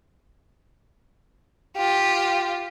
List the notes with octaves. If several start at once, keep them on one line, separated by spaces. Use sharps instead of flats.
F4 G4